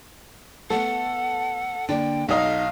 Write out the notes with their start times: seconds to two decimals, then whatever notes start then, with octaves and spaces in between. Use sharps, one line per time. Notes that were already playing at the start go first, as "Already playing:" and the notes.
0.70 A3 B3 A4 F#5
1.89 D3 A#3 D4 G5
2.28 B1 D#4 A4 D#5 F5